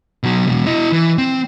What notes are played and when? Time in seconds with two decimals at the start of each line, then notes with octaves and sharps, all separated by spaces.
0.23 B2 F#3
0.47 E2 B2
0.66 E4 D#5
0.92 E3
1.18 C4